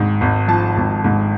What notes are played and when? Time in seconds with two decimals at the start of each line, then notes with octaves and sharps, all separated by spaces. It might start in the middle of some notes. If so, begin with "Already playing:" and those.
Already playing: G#1 G#2
0.21 G#1
0.48 F3 A5
0.77 G#1
1.04 G#2